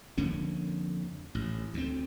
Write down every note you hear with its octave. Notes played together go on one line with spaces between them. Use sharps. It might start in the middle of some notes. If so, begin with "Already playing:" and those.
F2 D3 A#3 C#4
A1
D2 C4